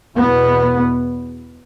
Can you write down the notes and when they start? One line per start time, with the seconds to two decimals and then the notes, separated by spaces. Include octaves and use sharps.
0.18 E2 B2 B3